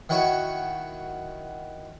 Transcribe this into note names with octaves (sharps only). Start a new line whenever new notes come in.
D#3 E4 F#4 C#5 C#6